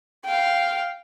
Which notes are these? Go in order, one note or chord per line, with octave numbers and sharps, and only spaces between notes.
F5 G5